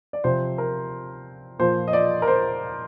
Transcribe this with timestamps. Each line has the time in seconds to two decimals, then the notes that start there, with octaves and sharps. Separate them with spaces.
0.13 D5
0.24 C3 F3 C5
0.58 A#4
1.59 A#2 F3 C5
1.88 D#5
1.93 D5
2.22 A#4
2.27 C5